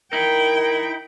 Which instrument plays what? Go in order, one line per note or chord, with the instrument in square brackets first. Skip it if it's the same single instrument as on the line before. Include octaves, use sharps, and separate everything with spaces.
[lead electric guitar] D#4 E4 [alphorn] A#4 [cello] G5